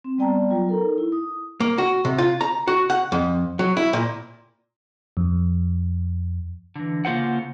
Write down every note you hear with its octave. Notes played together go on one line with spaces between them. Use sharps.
C4
G3 B3 D5 G5 A5 A#5
F#3 F4 A#5
D#4 A4 A#4
E4
D#6
A#3
F#4
C3
F4
A#5
F#4
F#5
F2
F#3
E4
A#2
F2
D3 E3
C#3 A#3 F4 C5 F#5